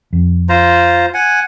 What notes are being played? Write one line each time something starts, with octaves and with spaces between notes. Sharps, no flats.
F2
F4 C5 A#5
F#5 G#5